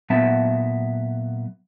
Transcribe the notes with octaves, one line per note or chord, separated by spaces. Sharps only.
A#2 F#3 B3 E5 A5